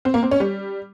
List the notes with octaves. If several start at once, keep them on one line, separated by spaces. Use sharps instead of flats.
C4
A#3
C4
C#4
G3